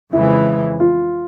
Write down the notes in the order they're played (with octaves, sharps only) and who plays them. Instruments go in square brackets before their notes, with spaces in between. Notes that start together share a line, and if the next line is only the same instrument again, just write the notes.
[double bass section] F2 C#3 E3 G#3 [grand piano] E4
[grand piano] F4